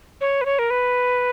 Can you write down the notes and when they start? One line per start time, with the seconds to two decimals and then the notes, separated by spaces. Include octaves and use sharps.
0.21 C#5
0.41 B4
0.45 C#5
0.59 A#4
0.70 B4